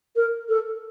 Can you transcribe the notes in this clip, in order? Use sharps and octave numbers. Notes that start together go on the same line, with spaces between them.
A#4
A4